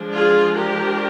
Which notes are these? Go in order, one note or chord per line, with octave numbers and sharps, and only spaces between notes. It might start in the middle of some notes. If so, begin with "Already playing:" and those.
Already playing: F3 G#3 D4
F4 G#4
G4 A#4